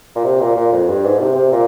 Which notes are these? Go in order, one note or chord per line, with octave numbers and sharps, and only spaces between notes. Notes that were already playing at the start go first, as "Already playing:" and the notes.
A#2
C3
A#2
A#2
F2
G2
G#2
C3
C3
A#2